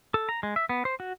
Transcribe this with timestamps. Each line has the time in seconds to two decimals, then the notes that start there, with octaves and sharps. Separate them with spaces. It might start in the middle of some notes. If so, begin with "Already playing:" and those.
0.14 A4
0.29 A#5
0.43 G#3
0.56 E5
0.69 B3
0.85 C5
1.00 F#4